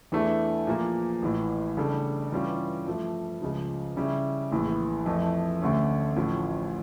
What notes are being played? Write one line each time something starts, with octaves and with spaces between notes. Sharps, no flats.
E2 E3 A3 D4
A#2 F3 A#3
A1 A2 E3
C#3 G3 D4 A4
G2 E3 G3 C#4 F4
G2 F3 A3
C#2 C#3 F3
C#3 G3 C#4 E4
A#1 A2 E3
F2 E3 A3
D2 D3 A3 C#4
A1 A2 F3 C#4